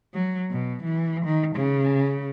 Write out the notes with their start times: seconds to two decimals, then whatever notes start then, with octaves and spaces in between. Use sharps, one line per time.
0.14 F#3
0.51 B2
0.84 E3
1.25 D#3
1.56 C#3